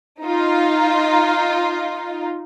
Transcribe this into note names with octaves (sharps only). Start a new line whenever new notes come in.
D#4 F4